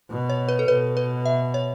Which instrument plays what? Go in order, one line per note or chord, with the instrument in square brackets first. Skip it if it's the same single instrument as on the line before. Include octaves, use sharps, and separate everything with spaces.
[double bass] B2
[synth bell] C#5
B4
A4
[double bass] B2 [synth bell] B4
[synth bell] B4
E5
C#5